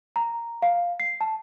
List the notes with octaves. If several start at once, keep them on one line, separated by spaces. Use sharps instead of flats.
A#5
F5
C7
A5